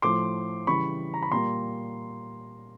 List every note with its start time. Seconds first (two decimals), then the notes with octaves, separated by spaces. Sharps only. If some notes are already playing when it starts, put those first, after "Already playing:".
0.02 A2 F3 A3 C6 D6
0.67 C#3 E3 G3 B5 C#6
1.14 A#5
1.23 B5
1.31 A#2 G3 A#3 A#5 C6